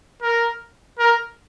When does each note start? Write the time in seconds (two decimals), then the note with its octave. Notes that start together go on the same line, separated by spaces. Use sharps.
0.22 A#4
0.99 A#4